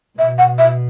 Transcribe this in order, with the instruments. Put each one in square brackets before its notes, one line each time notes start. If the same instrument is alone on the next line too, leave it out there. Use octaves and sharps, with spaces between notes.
[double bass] B2 [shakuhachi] E5
[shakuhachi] F#5
E5